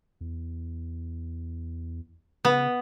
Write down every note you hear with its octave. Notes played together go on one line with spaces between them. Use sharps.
E2
C#3 B3